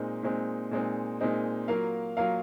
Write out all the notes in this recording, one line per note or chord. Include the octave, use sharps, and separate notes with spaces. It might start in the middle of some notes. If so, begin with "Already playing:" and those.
Already playing: A#2 G#3 C4 D#4
A#2 G#3 C4 D#4
A#2 G#3 C4 D#4
A#2 G#3 C4 D#4
F#3 A#3 F4 A#4 F5
F#3 A#3 F4 A#4 F5